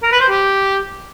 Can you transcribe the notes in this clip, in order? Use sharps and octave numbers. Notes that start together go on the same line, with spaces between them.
A#4
B4
C5
G4